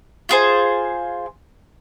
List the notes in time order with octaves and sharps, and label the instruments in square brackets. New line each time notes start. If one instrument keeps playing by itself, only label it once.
[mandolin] F4 G#4 C5